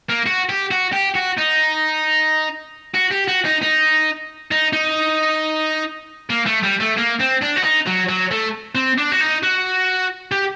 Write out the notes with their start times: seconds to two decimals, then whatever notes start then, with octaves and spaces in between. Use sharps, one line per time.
0.10 A#3
0.26 F#4
0.49 G4
0.71 F#4
0.93 G4
1.16 F#4
1.38 D#4
2.95 F#4
3.12 G4
3.28 F#4
3.45 D#4
3.62 D#4
4.51 D#4
4.73 D#4
6.30 A#3
6.46 A3
6.63 G3
6.80 A3
6.97 A#3
7.19 C4
7.42 D4
7.56 F#4
7.63 D#4
7.86 F#3
8.09 F#3
8.31 A3
8.75 C4
8.98 D4
9.12 F#4
9.21 D#4
9.43 F#4
10.32 G4